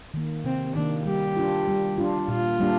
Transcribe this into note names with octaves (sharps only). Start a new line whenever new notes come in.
D#3 A#3
C3 C4
D#3 A#3 D4
G3 G4
D4 F4
G3
D4 F4
A#2 F4
G3 A#3 D4